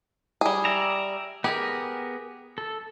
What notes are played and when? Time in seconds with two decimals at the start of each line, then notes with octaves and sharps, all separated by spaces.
0.41 G3 G#4
0.65 D5 E5 A#5
1.44 B3 G4 G#4 A#4
2.58 A4